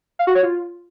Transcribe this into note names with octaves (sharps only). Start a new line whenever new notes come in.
F5
F#4
C#5
F4